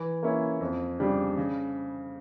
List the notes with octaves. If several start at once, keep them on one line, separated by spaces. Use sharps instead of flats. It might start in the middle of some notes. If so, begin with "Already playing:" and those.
Already playing: E3
A#3 C#4 E4
F2
C#3 G3 D4
C#3